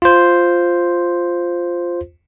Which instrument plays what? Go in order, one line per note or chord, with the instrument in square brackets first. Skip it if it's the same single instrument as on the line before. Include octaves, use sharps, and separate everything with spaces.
[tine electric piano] F4 C5